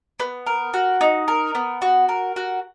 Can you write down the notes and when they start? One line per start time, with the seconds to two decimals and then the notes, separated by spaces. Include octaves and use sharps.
0.20 B3
0.46 A#4
0.74 F#4
1.01 D#4
1.28 A#4
1.55 B3
1.82 F#4
2.09 A#4
2.36 F#4